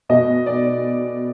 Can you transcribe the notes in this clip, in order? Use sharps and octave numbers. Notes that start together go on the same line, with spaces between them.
B2 D#5
D5